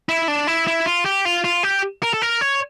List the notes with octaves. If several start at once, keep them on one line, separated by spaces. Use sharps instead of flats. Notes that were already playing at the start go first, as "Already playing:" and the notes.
E4
D4
E4
E4
F4
G4
F4
F4
G4
A#4
A4
A#4
C#5